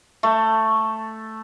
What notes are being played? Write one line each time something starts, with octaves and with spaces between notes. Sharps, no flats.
A3